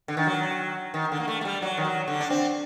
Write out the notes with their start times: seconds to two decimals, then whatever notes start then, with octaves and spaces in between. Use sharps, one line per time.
0.08 D3
0.17 D#3
0.27 F#3
0.94 D#3
1.12 D3
1.20 A#3
1.28 A3
1.41 A3
1.45 G3
1.62 F#3
1.78 D#3
1.85 F#3
2.08 D3
2.21 D4
2.30 C4